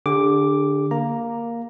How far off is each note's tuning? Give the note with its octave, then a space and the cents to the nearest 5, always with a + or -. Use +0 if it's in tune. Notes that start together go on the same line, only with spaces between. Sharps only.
D3 +0 G4 +45 D6 +0
A#3 +0 A#5 +0